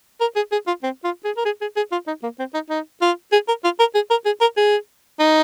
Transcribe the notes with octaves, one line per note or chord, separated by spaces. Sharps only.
A#4
G#4
G#4
F4
C4
F4
G#4
A#4
G#4
G#4
G#4
F4
D#4
A#3
C4
D#4
D#4
F4
G#4
A#4
F4
A#4
G#4
A#4
G#4
A#4
G#4
D#4